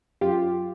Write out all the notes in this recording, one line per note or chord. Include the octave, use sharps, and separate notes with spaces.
F#2 F4 G4